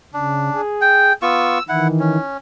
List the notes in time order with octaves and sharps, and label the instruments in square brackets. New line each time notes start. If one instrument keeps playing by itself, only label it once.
[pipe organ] C#3 [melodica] D4
[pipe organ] G#4
[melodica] G5
[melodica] B3 F4 C#6 [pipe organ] E6
[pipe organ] D#3 E3 [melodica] E4 F#5
[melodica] C#4